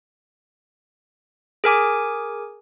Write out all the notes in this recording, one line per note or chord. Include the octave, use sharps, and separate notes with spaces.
G#4 A#4 G#5 D6